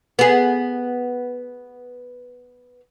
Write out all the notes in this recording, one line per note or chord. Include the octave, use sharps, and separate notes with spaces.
B3 G#4